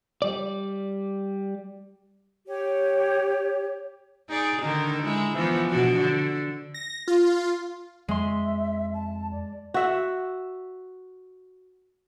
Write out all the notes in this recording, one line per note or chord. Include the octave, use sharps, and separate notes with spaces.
G3 D5
G4 C#5
D#4 G#4 D5
D3 D#3 D#4
G#3 E4
E3 F3 B3
B2 D4 F#4
D3
A#6
F4
F2 G#3 E5 C6
A5
D5
F#4 E5 F#5